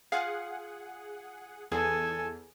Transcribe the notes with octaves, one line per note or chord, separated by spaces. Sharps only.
F4 G#4 F5 F#5
E2 G#4 A4 G#5